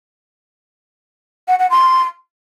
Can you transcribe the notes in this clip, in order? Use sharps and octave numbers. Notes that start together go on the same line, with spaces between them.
F#5
F#5
C6